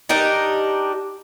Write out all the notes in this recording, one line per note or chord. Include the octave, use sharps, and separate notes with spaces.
D4 D#4 G4 A#4